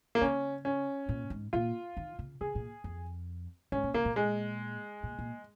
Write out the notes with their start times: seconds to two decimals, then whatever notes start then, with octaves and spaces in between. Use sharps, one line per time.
0.15 A#3
0.21 C#3 C#4
0.65 C#4
1.09 A#2
1.30 G#2
1.53 A#2 F4
1.97 D#3
2.19 C#3
2.41 C#3 G#4
2.55 A#2
2.84 F2
3.72 G#2 C#4
3.83 A#2
3.94 C#3 A#3
4.05 A#2
4.16 G#3
5.03 A#2
5.19 A#2